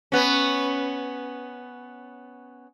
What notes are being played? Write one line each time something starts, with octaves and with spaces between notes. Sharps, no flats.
B3 C#4